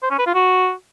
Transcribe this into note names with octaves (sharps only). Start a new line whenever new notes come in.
C5
C#4
B4
F4
F#4